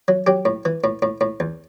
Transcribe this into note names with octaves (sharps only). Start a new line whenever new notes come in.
F#3
F#3 G4
A2
E3
A2
A2
A2
E2